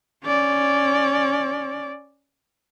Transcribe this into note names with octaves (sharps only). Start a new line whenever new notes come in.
C#4 D5